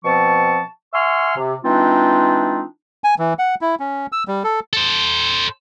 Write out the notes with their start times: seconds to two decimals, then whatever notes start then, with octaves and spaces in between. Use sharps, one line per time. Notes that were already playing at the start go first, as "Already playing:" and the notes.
0.05 B2 F3 C4 A5 C#6
0.94 E5 F#5 G#5 C6 C#6 F6
1.36 C3
1.64 E3 G#3 C4 D4 D#4 F4
3.04 G#5
3.19 E3
3.39 F#5
3.61 E4
3.80 C#4
4.12 E6
4.28 G3
4.44 A4
4.73 A4 C5